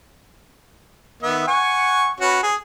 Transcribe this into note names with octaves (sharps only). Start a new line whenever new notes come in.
D#3 B3 E5
F#5 G#5 C#6
C#4 F#4 B4
G#4